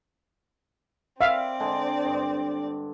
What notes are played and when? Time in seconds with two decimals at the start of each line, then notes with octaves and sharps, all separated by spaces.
1.21 C4 D5 E5 F5
1.60 D3 G#3
2.06 G2